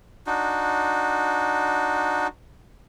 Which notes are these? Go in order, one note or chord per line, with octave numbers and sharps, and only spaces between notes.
D4 D#4 F#4